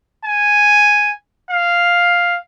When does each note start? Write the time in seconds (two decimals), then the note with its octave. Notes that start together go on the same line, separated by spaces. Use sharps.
0.25 G#5
1.50 F5